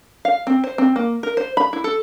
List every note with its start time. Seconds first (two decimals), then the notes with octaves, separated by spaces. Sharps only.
0.25 F5
0.47 C4
0.64 C5
0.78 C4
0.96 A#3
1.23 A#4
1.37 C5
1.57 B5
1.73 E4
1.84 A4